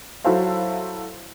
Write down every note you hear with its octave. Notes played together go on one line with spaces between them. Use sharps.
F#3 E4 F#4 A4 C5 F5